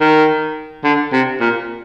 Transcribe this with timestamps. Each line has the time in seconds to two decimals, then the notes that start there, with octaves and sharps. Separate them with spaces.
0.01 D#3
0.84 D3
1.13 C3
1.40 A#2